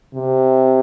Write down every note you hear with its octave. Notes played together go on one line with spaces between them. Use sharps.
C3